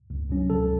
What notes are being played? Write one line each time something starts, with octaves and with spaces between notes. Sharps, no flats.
C#2
B2 F#3 C#4
C#2 A4